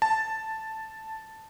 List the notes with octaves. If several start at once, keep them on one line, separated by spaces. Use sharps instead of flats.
A5